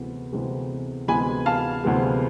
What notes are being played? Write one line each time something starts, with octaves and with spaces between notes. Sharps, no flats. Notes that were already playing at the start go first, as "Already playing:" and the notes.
Already playing: D2 C3 E3 G#3 B3
D2 C3 E3 G#3 B3
D2 C3 E3 G#3 B3 G#5 B5
F5 A5
D2 C3 E3 G#3 B3